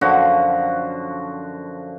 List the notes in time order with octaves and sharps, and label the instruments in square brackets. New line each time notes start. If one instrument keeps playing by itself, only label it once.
[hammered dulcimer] F#2 D3 F3 F#4